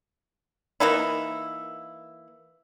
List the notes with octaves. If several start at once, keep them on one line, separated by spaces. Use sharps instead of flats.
E3 A#3 D#4 E4